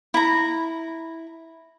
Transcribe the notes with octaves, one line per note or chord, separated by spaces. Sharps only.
E4 A#5